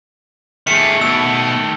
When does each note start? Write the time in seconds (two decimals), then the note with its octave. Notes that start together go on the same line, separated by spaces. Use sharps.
0.67 D#3 A3 G#4 E5 C#7
1.01 B2 E6